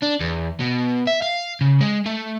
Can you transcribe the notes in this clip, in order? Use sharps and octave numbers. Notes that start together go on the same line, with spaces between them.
D4
E2
B2
E5
F5
C#3
G#3
A3